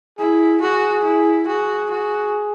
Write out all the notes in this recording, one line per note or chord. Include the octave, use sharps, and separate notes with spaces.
E4 G#4
F#4 G#4
E4
F#4 G#4
F#4